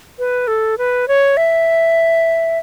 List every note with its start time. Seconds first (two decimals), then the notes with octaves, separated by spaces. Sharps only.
0.19 B4
0.48 A4
0.78 B4
1.08 C#5
1.37 E5